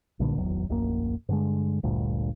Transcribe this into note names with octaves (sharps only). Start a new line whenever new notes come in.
B1 G2 A#2 D3
D1 G#1 E2 F#3
D1 A#1 F#2 A#3
G2 D3 G#3
G1 D2 G2 A#2